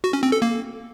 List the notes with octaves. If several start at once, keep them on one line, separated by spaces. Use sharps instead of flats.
F#4
C#4
C4
A4
A#3